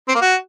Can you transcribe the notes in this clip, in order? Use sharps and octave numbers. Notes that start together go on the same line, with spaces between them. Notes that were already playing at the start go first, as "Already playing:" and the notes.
C4
A#3
F#4